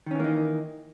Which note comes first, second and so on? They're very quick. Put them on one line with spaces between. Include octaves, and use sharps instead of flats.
D#3 C#4 E3 A#3 D#4